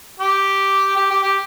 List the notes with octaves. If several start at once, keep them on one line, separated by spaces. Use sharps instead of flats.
G4
G4
G4
G4